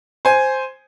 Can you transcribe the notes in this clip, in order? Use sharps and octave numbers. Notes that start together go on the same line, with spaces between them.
C5 G#5